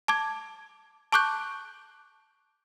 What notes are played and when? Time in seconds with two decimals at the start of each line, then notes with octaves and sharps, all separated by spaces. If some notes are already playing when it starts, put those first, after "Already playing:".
0.08 A5 D6 G#6
1.12 A5 C#6 D6 F#6 G6